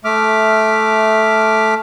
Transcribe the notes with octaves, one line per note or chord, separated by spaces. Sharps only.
A3 E5 D6 F6